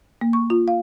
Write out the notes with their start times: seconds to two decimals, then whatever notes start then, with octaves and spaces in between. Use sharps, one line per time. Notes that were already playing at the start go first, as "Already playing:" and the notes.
0.21 A#3
0.33 C#6
0.50 F4
0.68 F5